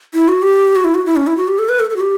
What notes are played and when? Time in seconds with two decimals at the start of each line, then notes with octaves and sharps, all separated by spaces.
0.14 E4
0.28 F#4
0.42 G4
0.76 F#4
0.84 E4
0.95 F#4
1.06 E4
1.16 C#4
1.27 E4
1.37 F#4
1.48 G4
1.59 A4
1.69 B4
1.80 A4
1.90 A4
1.96 F#4
2.01 G4